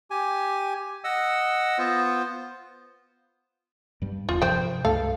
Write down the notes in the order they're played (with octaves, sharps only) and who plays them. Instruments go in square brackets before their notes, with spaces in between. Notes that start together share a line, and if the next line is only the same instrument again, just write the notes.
[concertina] G4 G#5
D#5 F#5 E6
B3 F4 C5
[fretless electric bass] G2 G3
[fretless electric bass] D1 A#1 E2 [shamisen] F4
[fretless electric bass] G2 C3 F3 [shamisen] C5 G5
[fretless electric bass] C#2 G2 A3 [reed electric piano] A4 [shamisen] F5